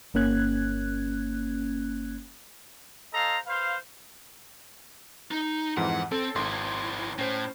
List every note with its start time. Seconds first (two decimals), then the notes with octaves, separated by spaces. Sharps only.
0.14 G1 A#3 C#4 F#6 G#6
3.13 A4 C5 D#5 F5 A#5
3.46 B4 C5 F5
5.31 D#4
5.77 F2 G#2 E3 F#5
6.12 C4 A4
6.35 G#1 D#2 E4 C6
7.18 A2 C#4 C5